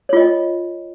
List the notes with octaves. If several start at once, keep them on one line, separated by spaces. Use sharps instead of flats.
F4 C#5 D#5 G5